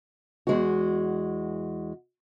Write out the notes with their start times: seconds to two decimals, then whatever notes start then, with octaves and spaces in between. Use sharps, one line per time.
0.47 E2 G#3 F#4